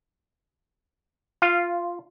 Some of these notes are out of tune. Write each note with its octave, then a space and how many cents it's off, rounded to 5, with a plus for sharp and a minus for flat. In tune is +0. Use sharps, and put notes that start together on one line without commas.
F4 +0 F5 -15